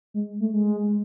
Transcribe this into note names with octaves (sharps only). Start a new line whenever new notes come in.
G#3
A3
G#3